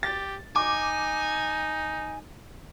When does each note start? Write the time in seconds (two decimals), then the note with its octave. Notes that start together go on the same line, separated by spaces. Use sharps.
0.03 G4 A6
0.56 D#4 G#5 D6